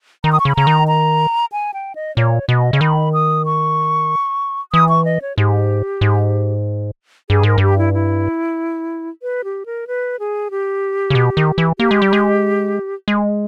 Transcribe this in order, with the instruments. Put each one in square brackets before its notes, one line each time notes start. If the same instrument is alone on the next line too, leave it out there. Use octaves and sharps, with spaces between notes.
[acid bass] D#3 [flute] A#5
[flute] D#6
C#6
[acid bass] C#3
[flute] B5
[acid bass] C#3 [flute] A#5
[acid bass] D#3
[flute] A#5
G#5
G5
D#5
[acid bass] A#2 [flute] C#5
[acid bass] B2 [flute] D#5
[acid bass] C#3
[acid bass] D#3 [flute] B5
[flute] D#6
C#6
[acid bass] E3 [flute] D#6
[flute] C#6
D#5
C#5
[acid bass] G#2 [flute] G4
[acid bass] G#2
[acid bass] G2 [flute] G#4
[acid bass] G#2 [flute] A#4
[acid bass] G2 [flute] G4
[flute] E4
E4
B4
G4
A#4
B4
G#4
G4
[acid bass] C#3
B2
D#3
E3
[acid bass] A#3 [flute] G4
[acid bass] G#3
G3
G#3
G#3